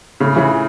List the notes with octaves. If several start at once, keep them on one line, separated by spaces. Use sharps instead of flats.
A2 C#3
C#3 E3